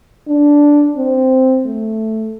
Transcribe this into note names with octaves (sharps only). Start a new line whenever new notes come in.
D4
C4
A3